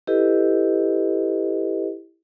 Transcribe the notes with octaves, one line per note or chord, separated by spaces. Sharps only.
E4 G4 A4 B4 D#5